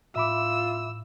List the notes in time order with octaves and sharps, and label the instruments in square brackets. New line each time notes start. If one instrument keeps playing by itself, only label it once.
[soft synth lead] A2 [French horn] F4 [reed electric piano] E5 B5 D6 [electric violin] E6